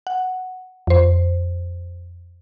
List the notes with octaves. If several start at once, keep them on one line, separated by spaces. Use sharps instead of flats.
F#5
F2 C5